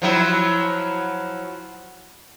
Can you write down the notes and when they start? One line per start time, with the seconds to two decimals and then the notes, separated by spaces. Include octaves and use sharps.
0.02 F3 F#3 E4